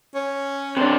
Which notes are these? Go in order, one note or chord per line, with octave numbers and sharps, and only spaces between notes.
C#4
C3 D4